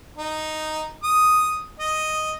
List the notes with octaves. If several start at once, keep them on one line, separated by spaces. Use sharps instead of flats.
D#4
D#6
D#5